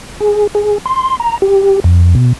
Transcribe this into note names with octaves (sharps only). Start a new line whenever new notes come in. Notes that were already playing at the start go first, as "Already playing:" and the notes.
G#4
G#4
C6
A#5
G4
F2
B2